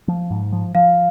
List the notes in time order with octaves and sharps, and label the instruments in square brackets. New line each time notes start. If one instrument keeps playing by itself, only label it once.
[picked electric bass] F3
G#2
F3
[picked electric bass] F3 [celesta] F5